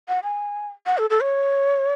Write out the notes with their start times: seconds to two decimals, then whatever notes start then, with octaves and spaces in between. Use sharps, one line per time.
0.08 F#5
0.23 G#5
0.86 F#5
0.98 A4
1.10 A4
1.22 C#5